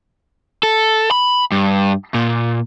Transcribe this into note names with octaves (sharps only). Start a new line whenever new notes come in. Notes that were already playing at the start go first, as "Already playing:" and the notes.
A4
B5
G2
A#2